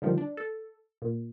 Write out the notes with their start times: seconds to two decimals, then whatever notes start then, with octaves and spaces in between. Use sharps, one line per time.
0.02 D3 D#3 F3 G3
0.18 D4
0.37 A4
1.02 A#2